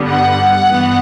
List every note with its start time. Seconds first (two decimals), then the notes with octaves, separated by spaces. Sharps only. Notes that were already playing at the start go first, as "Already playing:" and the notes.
Already playing: G2 D3 G3 B3
0.09 F#5
0.69 G2 E3 B3